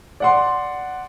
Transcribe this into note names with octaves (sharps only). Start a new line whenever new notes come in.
D5 F#5 C6